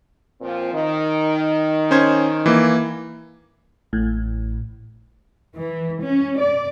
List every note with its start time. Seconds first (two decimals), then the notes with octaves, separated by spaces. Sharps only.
0.41 A#2 F3 C4
0.72 D#3
1.91 C#4 C5 G#6
2.46 E3 A#3
3.93 A1 A2
5.57 E3
6.03 C#4
6.40 D5